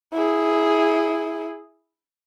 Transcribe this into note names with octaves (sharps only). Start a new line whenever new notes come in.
E4 G#4